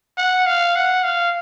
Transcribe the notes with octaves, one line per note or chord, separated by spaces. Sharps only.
F#5
F5
F#5
F5